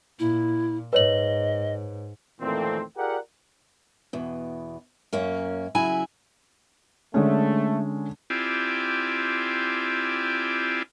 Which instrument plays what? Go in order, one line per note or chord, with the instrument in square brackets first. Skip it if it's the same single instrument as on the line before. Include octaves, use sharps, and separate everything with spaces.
[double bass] A#2 [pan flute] E4
[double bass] G#2 [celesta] B4 C#5 F#7 [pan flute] D#5
[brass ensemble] F2 A#2 D#3 E3 A3 C4
F4 G4 G#4 A#4 D5 F#5
[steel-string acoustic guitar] E2 B2
F#2 A#3 C#4
C#3 F#3 E4 E5 G#5
[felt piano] D3 G#3 C#4 [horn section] A3
[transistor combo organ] C4 E4 F4 G4 D5 G#5